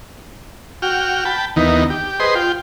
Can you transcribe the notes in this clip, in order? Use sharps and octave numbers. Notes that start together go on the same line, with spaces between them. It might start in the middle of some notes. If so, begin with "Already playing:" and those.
F#4 G5 F6
G5 A5 B5
D#2 D#3 E3 B3 D#4
G4
G#4 B4 C5 D#5 C6
F4 G5